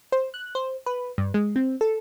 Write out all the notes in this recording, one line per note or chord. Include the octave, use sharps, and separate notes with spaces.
C5
F#6
C5
B4
G2
G#3
C4
A4